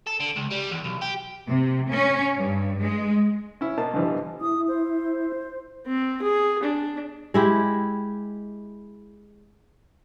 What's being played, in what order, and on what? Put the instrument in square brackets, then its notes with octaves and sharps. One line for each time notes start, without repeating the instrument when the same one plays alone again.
[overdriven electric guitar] A4
D3
C#2
G3
E2
B1
G4
[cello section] C3
C#4
G2
G#3
[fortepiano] C#4 E4
B2 A#3 A5
G2 B2 D3 E3 F3 G3
[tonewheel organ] E4 [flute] D#6
[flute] C5
[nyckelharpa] C4
G#4
D4
[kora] G#3 E4 G4